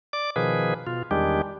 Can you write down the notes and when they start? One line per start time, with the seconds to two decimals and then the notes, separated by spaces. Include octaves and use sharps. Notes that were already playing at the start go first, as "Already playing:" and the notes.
0.13 D5 D6
0.36 B2 D#3 F3 G#4 B4
0.87 B2 F4
1.11 E2 D#3 G3 G#3 D4 G4